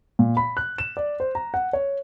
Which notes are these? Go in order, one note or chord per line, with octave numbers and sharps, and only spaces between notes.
A#2
B5
F#6
E7
D5
C5
A#5
F#5
C#5